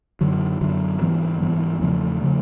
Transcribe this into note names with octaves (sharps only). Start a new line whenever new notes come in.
F#2 D3 F#3
F#2 D3 F#3
G#2 E3 G3 B3
G#2 E3 G3 B3
E2 C#3 F3 A3
C#3 F3 A3